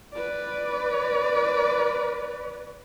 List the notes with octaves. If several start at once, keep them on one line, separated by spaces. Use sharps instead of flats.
B4 D5